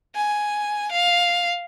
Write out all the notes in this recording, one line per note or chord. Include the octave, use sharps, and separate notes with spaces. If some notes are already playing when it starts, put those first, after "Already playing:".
G#5
F5